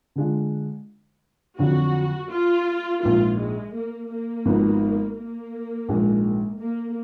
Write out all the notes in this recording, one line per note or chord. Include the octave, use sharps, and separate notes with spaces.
D3 G#3 D4 F4
F2 D3 F#3 D4 F4 F#4
F4
A#1 G#2 F3 F4
G#3
A#3
A#3
G#1 G#2 F3 B3 D#4
A#3
A#1 G#2 F3 G#3
A#3